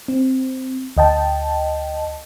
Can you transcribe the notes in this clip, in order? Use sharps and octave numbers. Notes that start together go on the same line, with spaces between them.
C4
D2 D#5 G5 A5